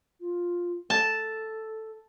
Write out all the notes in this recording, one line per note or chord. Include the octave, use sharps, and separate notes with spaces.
F4
A4 A5